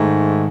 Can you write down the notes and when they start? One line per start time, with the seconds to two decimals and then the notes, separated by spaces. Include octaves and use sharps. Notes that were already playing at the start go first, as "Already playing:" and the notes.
Already playing: G#2 D#3 A3